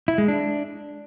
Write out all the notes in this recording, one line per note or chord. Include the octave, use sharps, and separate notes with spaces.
E4
G#3
D4